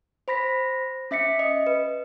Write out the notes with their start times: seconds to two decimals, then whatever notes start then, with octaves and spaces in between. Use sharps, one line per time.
0.28 C5 B5 A#6 B6
1.11 C#4 E5 B6 C#7
1.39 D#5
1.67 B4